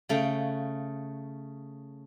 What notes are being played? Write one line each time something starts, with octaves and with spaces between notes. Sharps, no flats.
C#3 A3 F5 G5